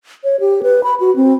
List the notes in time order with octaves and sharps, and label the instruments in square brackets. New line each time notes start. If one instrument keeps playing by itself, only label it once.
[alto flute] C#5
G4
B4
B5
F#4
C4